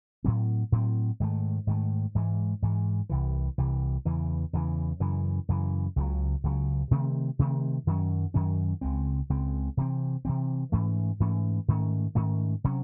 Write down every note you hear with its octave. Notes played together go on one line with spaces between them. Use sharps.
A2 F#3 C4
A2 F#3 C4
G#2 D#3 A3
G#2 D#3 A3
G#2 E3 G#3
G#2 E3 G#3
C2 C3 E3
C2 C3 E3
E2 C#3 E3
E2 C#3 E3
F#2 C#3 E3
F#2 C#3 E3
C#2 C#3 F#3
C#2 C#3 F#3
C3 D#3 A3 C4
C3 D#3 A3 C4
F#2 D#3 F#3 C#4
F#2 D#3 F#3 C#4
C#2 C#3 G#3 C4
C#2 C#3 G#3 C4
C3 E3 C4
C3 E3 C4
G#2 E3 A3 C#4
G#2 E3 A3 C#4
G#2 D#3 A3 C#4
G#2 D#3 A3 C#4
C3 F#3 C#4